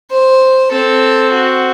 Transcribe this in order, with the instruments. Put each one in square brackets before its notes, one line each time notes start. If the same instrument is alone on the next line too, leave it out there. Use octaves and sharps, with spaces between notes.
[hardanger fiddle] C5
[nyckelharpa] C4 [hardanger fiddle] A4
[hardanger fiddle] F#4